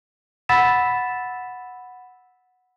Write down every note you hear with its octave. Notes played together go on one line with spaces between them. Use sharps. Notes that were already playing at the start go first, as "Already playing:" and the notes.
F#5 B5 E6 A6 B6 E7